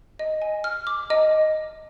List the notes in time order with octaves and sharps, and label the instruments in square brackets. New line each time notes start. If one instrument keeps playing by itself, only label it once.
[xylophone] D#5
G#5
F6
D6
D#5